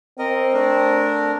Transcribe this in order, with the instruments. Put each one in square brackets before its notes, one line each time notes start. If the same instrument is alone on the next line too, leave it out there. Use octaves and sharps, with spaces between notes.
[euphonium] C4 [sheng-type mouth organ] A#4 D#5
[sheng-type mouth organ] A3 D4 A#4